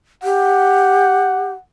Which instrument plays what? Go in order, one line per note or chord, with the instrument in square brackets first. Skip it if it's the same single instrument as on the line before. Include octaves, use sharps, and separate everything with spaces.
[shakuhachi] G4 [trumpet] F#5